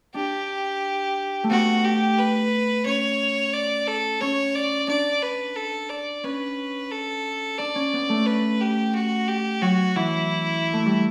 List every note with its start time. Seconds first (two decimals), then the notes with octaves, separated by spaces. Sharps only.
0.14 D4 G4
1.44 A3
1.50 B3 F#4
1.84 G4
2.18 B4
2.85 C#4 C#5
3.53 D5
3.87 A4
4.21 C#4 C#5
4.55 D5
4.88 D4 D5
5.22 B4
5.56 A4
5.90 D5
6.24 C#4 B4
6.91 A4
7.59 D4 D5
7.75 C#4
7.93 B3
8.09 A3
8.26 B4
8.60 G4
8.94 F#4
9.28 G4
9.61 F#3 F#4
9.96 E3 E4
10.73 A3
10.86 G3